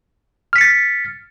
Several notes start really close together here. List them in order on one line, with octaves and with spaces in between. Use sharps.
F6 B6 C#7 A6